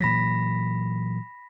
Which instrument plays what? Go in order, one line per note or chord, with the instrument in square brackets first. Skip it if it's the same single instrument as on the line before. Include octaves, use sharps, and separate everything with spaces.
[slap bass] A#2 E3 F#3 [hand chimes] B5 A#6 B6